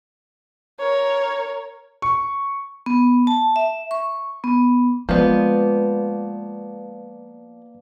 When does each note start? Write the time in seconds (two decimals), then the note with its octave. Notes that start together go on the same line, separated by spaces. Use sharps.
0.79 A#4 C#5
2.02 C#6
2.86 B3
3.27 A5
3.56 E5
3.91 C#6
4.44 B3
5.09 F3 G#3 A#3 B3 B4 D5 G6